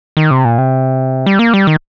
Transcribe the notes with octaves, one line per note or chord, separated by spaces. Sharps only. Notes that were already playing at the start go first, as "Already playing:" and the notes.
D#3
C3
A#2
C3
G3
A#3
G3
D#3